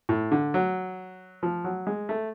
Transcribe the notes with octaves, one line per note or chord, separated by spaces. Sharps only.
A2
D3
F#3
F3
F#3
G#3
A3